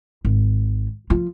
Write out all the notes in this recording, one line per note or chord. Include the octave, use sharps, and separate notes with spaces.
G#1
F3 F4